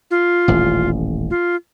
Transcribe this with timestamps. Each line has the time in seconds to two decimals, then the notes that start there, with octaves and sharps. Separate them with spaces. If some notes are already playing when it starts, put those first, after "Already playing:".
0.11 F4
0.48 D#1 A1
1.30 F4